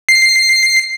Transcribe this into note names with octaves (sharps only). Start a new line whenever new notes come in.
C7